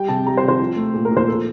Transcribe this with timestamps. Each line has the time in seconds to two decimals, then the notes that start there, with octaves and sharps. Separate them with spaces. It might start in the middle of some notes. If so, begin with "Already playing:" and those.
Already playing: G3 G5
0.08 C3 A5
0.26 G3 A#5
0.37 C5
0.43 C3
0.48 C5
0.60 F3
0.76 A3
0.94 A#2 A4
1.05 A#4
1.11 A#2
1.17 C5
1.27 F3 A4